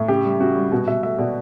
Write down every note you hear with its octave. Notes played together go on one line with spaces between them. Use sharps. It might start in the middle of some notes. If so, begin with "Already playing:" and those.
Already playing: A2
C#3 G4
G3
C#3 F#4
G3
B2 F#4
B2 E5
A3 E5
B2 D5